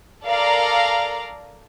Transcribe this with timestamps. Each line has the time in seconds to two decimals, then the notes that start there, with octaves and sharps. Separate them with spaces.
0.24 A4 A#4 D5 F5 A#5